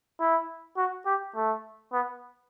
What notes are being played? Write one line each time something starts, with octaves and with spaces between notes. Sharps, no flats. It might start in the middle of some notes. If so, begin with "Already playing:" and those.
E4
F#4
G4
A3
B3